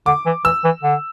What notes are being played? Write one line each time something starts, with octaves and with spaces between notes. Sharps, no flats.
D3 D6
E3
E3 E6
E3
D3